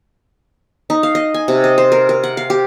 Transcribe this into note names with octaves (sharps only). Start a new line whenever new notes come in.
D#4
F5
D#5
G#5
C3
D#5
C5
A#4
A#4
F#5
F5
G4